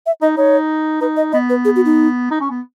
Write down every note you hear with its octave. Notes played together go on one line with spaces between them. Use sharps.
E5
D#4 D#5
D#4 C#5
D#4 B4
D#5
B3 D#5
B4
G#4
F#4
D#4
D#4
C#4
B3